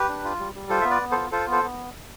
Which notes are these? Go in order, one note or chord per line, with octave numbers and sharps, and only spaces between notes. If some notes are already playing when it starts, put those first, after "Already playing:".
Already playing: G4 B4
D4
F4
G3
G3
F4 A4 C5
B3 E5
B4 D5
B3
F4 A4 C5
F4 A4 C5
B3 A4 C5
B3